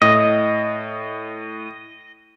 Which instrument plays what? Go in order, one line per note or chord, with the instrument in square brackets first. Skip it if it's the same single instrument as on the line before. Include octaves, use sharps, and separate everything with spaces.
[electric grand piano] A2 [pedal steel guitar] D#5